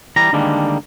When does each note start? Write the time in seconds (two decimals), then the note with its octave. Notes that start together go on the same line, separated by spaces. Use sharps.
0.16 E3 G3 A#5
0.33 D3 D#3 G3 G#3 A#3 D4